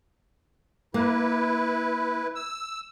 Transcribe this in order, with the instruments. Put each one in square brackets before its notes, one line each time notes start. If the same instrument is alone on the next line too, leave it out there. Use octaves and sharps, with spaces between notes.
[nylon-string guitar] A#3 [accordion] E4 B4
[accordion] E6